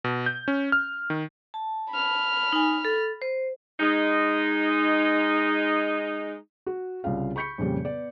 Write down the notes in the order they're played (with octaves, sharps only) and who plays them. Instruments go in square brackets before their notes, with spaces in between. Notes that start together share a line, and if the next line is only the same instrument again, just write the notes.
[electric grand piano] B2
G6
C#4
F6
D#3
[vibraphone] A5
[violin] B5 F6
[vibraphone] D#4 G#5
A4
C5
[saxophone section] G#3 D#4
[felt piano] F#4
C2 C#3 F4 F5
B5 C#6 G6 B6 C#7
F2 A#2 C#3 G3
B3 D5